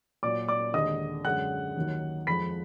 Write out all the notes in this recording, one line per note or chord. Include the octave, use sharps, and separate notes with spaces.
A#2 F#3 D5 D6
D5 D6
D#2 D3 G#3 D#5 D#6
F#2 D3 G#3 F#5 F#6
D#2 D#3 F#3
F2 F3 G#3 B5 B6